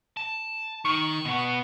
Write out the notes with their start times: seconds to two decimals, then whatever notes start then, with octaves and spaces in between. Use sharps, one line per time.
0.17 A5
0.85 D#3 C#6
1.25 B2 B3